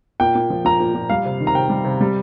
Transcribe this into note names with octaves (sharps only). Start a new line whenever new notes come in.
A#2 G5
A#2
F3
F3 A#5
A#2
A#2
G3 F5
C3
D#3
A#5
C3 G5
G3
C3
G3